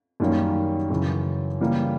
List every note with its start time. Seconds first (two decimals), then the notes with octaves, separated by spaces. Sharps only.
0.20 F#2 D#3 G3 A#3 C#4
0.90 F#2 C#3 E3
1.60 C#3 E3 G3 A#3